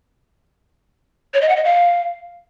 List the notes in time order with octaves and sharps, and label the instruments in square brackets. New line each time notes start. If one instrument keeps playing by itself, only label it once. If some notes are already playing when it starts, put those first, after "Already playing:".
[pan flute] C#5
D#5
F#5
D#5
F5